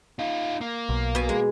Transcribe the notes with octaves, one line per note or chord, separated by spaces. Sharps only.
D#4 F4
A#3
B1
B2 G#5
G#3